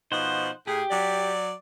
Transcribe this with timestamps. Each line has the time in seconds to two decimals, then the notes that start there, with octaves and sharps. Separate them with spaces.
0.12 B2 F3 D#4 C5 F#5
0.67 A2 G4 G#4
0.91 F#3 D5